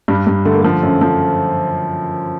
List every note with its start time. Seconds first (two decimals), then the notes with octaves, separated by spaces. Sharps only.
0.08 G2 G3
0.27 G2
0.45 D3 A3
0.54 A#3
0.63 F3 A3
0.83 F#2
1.01 F3